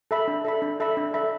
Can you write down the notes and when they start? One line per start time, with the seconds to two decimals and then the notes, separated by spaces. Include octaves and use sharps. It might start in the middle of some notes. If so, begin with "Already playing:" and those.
0.11 A4 E5 B5
0.28 D4
0.45 A4 E5 B5
0.62 D4
0.80 A4 E5 B5
0.97 D4
1.14 A4 E5 B5